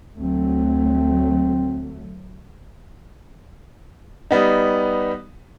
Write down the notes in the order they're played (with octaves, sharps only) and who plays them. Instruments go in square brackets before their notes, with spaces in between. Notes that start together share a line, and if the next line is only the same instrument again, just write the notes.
[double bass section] D2 F#3 A3 [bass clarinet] C4
[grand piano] G3 B3 D#4